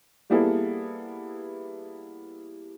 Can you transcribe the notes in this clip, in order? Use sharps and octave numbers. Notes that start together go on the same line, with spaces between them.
G3 A#3 B3 E4 G#4 A4